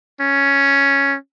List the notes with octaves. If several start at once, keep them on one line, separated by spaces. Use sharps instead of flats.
C#4